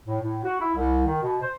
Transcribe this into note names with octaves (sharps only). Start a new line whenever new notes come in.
A2
A2
F#4
E4
C2
D#3
B2
C5